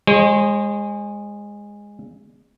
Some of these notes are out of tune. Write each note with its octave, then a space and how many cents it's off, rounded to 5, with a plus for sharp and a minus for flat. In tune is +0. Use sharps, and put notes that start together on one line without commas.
G#3 -15 C5 +45